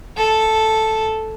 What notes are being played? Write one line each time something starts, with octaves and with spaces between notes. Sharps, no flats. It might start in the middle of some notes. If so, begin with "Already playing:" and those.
A4